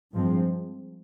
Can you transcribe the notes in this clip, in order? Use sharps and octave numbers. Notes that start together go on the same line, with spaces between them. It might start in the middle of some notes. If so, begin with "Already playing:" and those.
G2 F3 G#3 C4